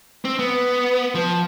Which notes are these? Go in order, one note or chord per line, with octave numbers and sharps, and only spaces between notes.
C4
B3
F3